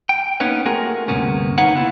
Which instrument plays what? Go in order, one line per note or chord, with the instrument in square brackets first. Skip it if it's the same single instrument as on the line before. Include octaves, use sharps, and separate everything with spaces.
[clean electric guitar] G5
A#3 B3 C#4 D#4 B4 C#5
A3 F4 F#4 G#4 A#4
D2 G2 C3 A#3 B3 C#4
A#3 D#4 B4 C#5 F5 F#5
C#3 B3 E4 F4